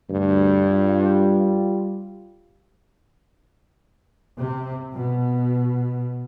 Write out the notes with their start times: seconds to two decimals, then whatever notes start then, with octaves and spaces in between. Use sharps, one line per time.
0.10 D2 G2
0.70 G3 F4
4.39 C3
4.94 B2